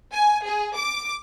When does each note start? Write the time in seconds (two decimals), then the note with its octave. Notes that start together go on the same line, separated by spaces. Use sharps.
0.13 G#5
0.45 G#4
0.77 D6